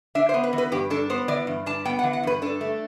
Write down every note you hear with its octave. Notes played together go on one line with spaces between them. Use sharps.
D4 E5
C5
B3
B4
E3
B4
G2 G4
D4 A4
B3 C5
E3 D5
G2
D4 A5
B3 G5
F#5
E3
F#5
G2 B4
D4 A4
A3